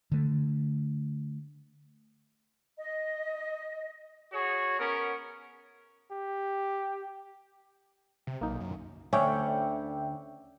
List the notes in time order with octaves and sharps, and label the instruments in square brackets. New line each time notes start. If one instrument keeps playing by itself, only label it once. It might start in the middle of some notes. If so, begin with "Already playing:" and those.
[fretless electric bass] D3 A3
[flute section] D#5
[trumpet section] F#4 G#4 C#5
B3 C#4 A#4
[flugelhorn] G4
[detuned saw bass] C3
[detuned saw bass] B1 [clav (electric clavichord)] A#3 D#4
[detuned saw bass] F#2
[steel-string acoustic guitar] D2 D3 [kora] C#4 [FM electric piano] D5 E5 G5